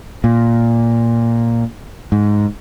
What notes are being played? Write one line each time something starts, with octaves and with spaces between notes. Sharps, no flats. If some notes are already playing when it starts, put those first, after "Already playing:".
A#2
G#2